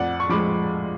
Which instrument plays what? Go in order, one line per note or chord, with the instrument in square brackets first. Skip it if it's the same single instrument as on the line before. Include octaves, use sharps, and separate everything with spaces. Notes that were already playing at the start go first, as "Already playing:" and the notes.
Already playing: [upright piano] F2 D5 F#5
C#6
F3 G#3 B5 D6